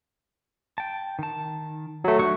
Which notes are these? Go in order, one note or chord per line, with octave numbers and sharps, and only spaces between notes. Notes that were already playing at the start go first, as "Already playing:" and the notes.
G5 A5
D#3 A5
F#3 A3
F#3 D4 F#4 C#6